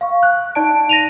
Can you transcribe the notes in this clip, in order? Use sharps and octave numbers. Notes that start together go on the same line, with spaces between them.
F5 C#6
F#6
D#4 D5 A5 D7
A#6 D#7 F7